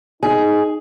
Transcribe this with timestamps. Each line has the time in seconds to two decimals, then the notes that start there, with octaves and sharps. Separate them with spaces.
0.23 D#4 G#4